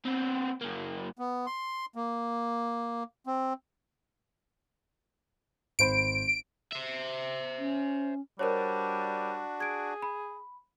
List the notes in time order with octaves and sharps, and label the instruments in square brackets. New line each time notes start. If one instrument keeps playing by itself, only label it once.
[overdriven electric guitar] B3 C4
F#2 A#3
[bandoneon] B3
C6
A#3
C4
[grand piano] G#1 C5 B5 [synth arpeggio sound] D7
[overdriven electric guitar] C5 E5
[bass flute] C#4
[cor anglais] G3 [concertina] D4 F#4 [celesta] A#4 C5 C#5
[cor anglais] G#4 [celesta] G#6 D7
[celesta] B5